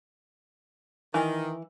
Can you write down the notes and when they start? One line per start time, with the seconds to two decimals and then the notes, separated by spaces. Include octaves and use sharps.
1.14 D#3 E3